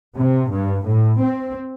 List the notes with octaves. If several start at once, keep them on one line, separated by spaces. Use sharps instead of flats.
C3
G2
A2
C4